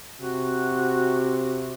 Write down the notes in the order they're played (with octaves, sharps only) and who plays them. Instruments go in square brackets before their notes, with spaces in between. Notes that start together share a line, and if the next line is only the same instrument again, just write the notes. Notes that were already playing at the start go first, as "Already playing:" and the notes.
[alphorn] C3 [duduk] F#4